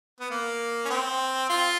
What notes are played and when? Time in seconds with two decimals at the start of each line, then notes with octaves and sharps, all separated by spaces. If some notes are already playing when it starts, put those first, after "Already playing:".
0.20 B3
0.31 A#3
0.85 C#4
0.90 C4
1.49 F4